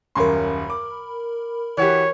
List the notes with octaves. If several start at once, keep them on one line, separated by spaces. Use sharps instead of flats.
D#1 F#2 A#4 B5 C6
D6
E3 F#4 G4 C#5